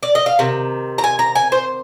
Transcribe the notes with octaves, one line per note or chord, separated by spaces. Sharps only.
D5
D#5
F5
C3 D#3
A#5
G#5
A#5
G#5
C5